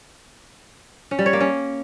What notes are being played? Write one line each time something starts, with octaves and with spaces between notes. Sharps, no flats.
C#4
G3
C#5
A#3
C#4